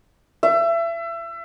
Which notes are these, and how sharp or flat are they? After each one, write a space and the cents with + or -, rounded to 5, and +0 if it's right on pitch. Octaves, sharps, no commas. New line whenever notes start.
E5 +30